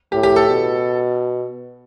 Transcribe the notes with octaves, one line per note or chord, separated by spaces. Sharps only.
A2 G4
G4
A4
B2